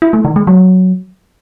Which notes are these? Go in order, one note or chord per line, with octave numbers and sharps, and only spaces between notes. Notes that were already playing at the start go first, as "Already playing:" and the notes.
E4
A3
D#3
G#3
F#3